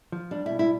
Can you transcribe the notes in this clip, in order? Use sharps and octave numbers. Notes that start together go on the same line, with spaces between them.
F3
G3 D4
E4
B2
E4